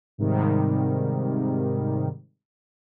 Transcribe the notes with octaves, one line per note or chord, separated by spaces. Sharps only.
G#2 C3 D#3 G3